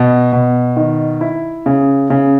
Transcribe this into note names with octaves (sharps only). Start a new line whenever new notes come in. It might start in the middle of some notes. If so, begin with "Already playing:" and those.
Already playing: B2
B2
D#3
E4
C#3
C#3